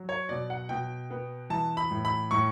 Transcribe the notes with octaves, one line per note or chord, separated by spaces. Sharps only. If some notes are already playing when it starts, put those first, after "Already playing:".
Already playing: F#3
C#5
B2 D5
F#5
B2 G5
B3
E3 A5
B5
A2
B5
A2 C#6